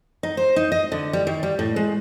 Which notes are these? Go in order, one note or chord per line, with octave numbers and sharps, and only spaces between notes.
D#4
C5
D#4
D#5
D3
G3
D#3
G3
A2
G#3